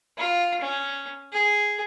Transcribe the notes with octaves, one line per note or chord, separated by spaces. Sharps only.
F4
C#4
G#4